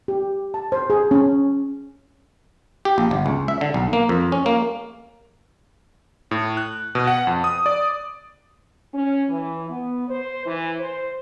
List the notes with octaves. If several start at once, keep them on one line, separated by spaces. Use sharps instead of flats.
G4
A5
C5
G#4
C#4
G4
A#1
G1
C#2
E5
D3
B1
A#3
F2
C#4
A#3
A2
F#6
B2
F#5
F2
D#6
D5
C#4
E3
B3
C5
E3
C5